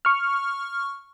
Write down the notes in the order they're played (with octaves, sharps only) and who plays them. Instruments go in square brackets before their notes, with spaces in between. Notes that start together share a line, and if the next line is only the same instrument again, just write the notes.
[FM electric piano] C#6 F6